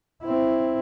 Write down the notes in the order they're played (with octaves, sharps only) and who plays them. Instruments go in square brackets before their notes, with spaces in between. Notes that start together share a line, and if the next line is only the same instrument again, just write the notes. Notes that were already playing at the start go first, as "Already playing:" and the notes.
[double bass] C4 E4